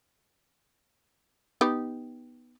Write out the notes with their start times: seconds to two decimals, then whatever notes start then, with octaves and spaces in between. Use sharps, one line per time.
1.61 B3 D#4 G4